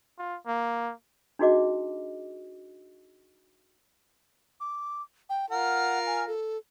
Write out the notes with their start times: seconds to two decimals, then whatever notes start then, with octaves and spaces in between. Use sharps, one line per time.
0.18 F4
0.47 A#3
1.39 D4 D#4 F#4 G#4 D#5 D6
4.60 D6
5.30 G5
5.50 F4 A#4 F#5
6.06 G#5
6.28 A4